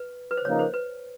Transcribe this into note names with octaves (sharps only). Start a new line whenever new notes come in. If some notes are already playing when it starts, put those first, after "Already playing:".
Already playing: B4
B4
C5
C#3 F3 A#3 D#4 C#5
C5
B4